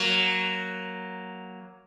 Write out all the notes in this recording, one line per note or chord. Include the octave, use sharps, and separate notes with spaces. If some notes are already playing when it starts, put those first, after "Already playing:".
Already playing: F#3 A#3